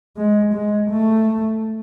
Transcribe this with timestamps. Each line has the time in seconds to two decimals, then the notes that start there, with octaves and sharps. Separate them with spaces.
0.17 G#3
0.54 G#3
0.90 A3